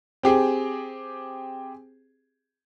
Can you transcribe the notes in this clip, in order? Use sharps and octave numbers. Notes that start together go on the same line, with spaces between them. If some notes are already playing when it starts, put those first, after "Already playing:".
C4 G4 G#4